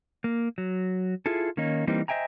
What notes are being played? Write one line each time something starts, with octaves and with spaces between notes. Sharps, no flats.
A#3
F#3
E4 F4 G#4 A4
D#3 A#3 C#4 D#4
E3 G3 A#3 C4 D#4
C5 D#5 E5 G5 G#5 A#5